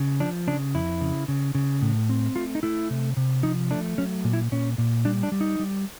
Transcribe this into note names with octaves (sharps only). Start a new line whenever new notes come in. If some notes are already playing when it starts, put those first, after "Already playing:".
Already playing: C#3
F3 D4
C#3 D4
F2 E4
C#3
C#3
C#3
A2
C4
A3 F4
D#4
A3 E4
C3
C3
F3 D#4
A3 D4
F#3 C#4
A#2
E4
A#2 C#4
A#2
G3 D4
D4
G3
D#4
G3